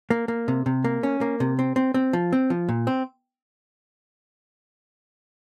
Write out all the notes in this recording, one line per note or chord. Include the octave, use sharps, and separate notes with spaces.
A#3
A#3
C3
C3
A#3
C#4
A#3
C3
C4
C4
C4
F3
C4
F3
A#2
C4